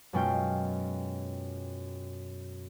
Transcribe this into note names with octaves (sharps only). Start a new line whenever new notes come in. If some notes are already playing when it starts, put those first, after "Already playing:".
F#2 B2 G#3 C#4 F4 G5